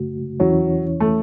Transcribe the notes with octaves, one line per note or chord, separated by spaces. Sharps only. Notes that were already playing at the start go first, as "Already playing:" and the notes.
Already playing: F#2 C#3 A3 F#4
E2 E3 F#3 C#4 E4 C#5
A3